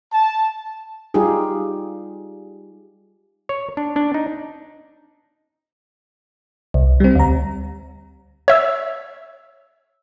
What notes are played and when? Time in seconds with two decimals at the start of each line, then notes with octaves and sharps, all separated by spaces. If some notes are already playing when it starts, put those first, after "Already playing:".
0.12 A5
1.14 G3 D#4 F4 G4 G#4
3.49 C#5
3.77 D4
3.96 D4
4.14 D#4
6.74 C2
7.00 G3 C4
7.15 D2 A#5
8.48 C#5 E5 E6